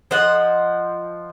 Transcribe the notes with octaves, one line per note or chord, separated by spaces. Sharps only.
F3 C5 D#5 F#5